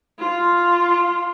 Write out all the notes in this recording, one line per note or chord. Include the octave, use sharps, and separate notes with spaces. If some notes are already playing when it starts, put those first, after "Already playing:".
F4